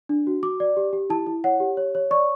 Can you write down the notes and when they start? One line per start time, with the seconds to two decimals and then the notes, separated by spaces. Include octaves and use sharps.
0.09 D4
0.27 F#4
0.43 F#4 D6
0.60 D5
0.77 G4
0.93 G4
1.10 E4 A5
1.26 E4
1.44 C#5 F#5
1.60 G4
1.77 C#5
1.95 C#5
2.11 D5 C#6